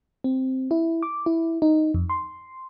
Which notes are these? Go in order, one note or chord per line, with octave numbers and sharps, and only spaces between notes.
C4
E4
D6
E4
D#4
F2
C6